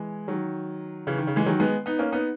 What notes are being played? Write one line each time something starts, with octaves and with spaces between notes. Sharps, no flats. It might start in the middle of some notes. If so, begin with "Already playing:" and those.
Already playing: E3 G#3
D#3 F#3
C#3 E3
D#3
C#3
E3 G#3
D#3 F#3
G#3 B3
B3 D#4
A#3 C#4
B3 D#4